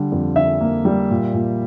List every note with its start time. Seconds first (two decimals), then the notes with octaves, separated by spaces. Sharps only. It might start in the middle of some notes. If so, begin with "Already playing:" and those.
Already playing: D3 G3
0.12 F2
0.36 D3 E5
0.61 A#3
0.85 G3
1.11 A#2
1.34 A#2